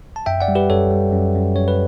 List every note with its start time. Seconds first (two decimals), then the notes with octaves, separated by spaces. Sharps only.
0.16 A5
0.26 F#2 E5 G5
0.41 D5 F#5
0.48 G3
0.55 G4 B4
0.70 F#2 A4 C#5
0.91 G3
1.13 F#2
1.35 F#2
1.56 F#2 C#5
1.68 B4